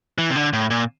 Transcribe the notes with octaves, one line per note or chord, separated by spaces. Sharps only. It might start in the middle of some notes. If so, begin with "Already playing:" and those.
E3
C3
D3
A2
A#2